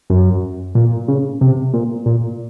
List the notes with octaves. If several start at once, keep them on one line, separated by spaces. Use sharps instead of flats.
F#2
A#2
C#3
C3
A#2
A#2